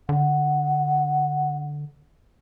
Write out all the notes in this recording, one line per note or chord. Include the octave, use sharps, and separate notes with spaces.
D3 F#5